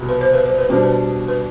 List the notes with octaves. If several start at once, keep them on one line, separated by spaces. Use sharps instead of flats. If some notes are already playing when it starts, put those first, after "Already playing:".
Already playing: C2 B2 G3
B4
C5
B4
C5
B4
B2 G3 B3 D4 C5
B4
B4